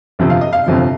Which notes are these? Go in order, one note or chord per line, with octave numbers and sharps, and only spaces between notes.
G1 F2 C3 F3
F5
D#5
F5
G1 F2 C3 F3